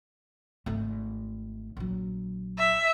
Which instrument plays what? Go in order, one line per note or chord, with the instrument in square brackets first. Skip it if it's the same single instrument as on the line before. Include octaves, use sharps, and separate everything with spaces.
[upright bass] G#1 A3
A#1 F#3
[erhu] E5